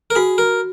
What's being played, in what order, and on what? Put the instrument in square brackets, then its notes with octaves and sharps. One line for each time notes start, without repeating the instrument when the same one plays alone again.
[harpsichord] A#4
[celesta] F#4 [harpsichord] G#4
[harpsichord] A#4